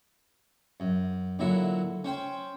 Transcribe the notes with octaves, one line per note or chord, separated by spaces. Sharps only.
F#2
A#2 D3 F#3 E4
C#4 C5 G5